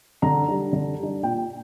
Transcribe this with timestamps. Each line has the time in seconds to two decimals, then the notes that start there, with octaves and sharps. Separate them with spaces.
0.22 D3 A#5
0.48 G3 D4
0.73 D3
0.98 G3 D4
1.23 A#2 G5